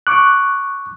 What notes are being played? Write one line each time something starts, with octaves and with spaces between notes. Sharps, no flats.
C#6 D6 F#6